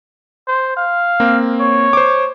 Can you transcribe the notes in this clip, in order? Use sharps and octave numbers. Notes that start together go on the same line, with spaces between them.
C5
F5
A#3 C4
C#5
C5 D6